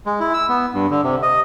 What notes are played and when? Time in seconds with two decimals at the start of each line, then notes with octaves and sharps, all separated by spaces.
0.06 G#3
0.20 E4
0.34 E6
0.49 B3
0.74 G2
0.90 D3
1.03 C3
1.23 D#5